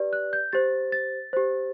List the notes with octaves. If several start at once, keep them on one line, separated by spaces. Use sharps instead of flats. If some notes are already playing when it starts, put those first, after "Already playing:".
Already playing: G4 B4 D5
F#6
G6
G4 C5 A6
A6
G4 C5